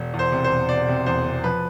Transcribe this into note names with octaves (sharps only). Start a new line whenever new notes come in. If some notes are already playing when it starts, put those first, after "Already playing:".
Already playing: E1
E2
C5
C3
C5
E1
E1 D5
C3
E2 C5
C3
F3 B4